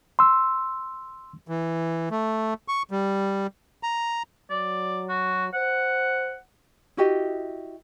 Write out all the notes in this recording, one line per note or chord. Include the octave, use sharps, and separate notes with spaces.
C6 E6
E3
A3
C#6
G3
A#5
F#3 D5
F#4
C5 F#5
E4 F#4 G4 D#5